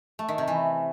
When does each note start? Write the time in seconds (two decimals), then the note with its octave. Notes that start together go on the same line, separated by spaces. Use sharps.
0.19 A3
0.28 D#3
0.38 C3
0.48 E3